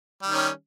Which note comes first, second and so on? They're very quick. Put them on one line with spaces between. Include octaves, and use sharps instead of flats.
G3 D#3 C#4